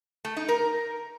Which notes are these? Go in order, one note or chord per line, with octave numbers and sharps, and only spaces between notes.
A3
D#4
A#4